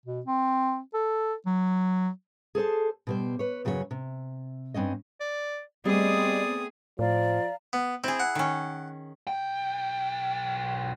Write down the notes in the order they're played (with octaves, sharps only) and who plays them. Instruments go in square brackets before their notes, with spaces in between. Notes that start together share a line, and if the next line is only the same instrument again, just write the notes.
[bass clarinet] B2
C4
A4
F#3
[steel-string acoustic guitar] G#4 A4 C5 A5
B2 G3 C5
B4 C#5
F#2 C#3 F#3 F#4 C#5
C3
G2 C4 C#4 D#5
[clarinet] D5
[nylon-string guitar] G3 D#5 [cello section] A3 B3 C4 [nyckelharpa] G#4 D#6 [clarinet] D5
[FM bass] A2 [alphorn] F3 [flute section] D5 F5 A#5
[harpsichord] B3
[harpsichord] C4 [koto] E4 G#4
[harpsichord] F#5
[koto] D#3 C#4
[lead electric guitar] B1 G5